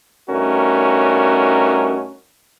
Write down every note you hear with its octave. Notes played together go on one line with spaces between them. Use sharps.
G2 A3 C#4 D#4 F#4 A#4